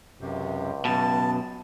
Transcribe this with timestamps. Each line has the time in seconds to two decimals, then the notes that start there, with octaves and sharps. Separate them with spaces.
0.21 C#2 F#2 C3
0.85 F#2 B2 A5